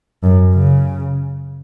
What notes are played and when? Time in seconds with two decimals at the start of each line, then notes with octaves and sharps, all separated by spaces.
0.23 F#2
0.54 C#3